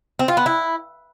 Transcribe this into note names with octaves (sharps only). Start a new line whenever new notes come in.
C4
F4
B3
E4